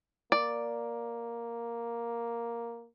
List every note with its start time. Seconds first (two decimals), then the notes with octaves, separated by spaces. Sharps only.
0.32 A#3 D5